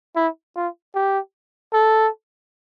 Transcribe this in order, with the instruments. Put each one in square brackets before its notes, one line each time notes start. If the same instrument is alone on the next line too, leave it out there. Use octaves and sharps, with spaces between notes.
[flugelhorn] E4
F4
G4
A4